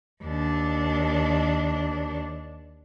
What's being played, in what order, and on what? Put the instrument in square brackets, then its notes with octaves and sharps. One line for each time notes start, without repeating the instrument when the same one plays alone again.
[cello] D#2 D4